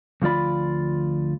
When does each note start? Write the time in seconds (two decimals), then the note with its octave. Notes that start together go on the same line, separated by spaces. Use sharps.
0.22 D2 F3 F4 D5 B5